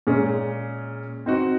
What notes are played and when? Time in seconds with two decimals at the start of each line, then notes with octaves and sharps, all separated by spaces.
0.07 A#2 G#3 C#4 G#4
1.26 C4 D#4 F#4